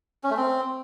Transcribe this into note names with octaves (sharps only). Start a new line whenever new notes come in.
C#4
A3
C4